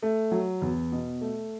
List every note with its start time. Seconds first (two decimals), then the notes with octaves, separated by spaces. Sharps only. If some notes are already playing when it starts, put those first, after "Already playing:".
0.02 A3
0.31 F#3
0.62 E2
0.92 B2
1.21 A3